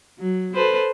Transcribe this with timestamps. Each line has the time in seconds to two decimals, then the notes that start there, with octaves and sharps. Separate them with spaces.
0.19 F#3
0.54 A4 B4 C5